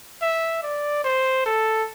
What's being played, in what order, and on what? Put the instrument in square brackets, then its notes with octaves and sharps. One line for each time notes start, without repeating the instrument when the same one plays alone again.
[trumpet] E5
D5
C5
A4